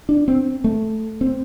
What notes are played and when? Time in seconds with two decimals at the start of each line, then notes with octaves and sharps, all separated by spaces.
0.09 D4
0.28 C4
0.64 A3
1.21 C4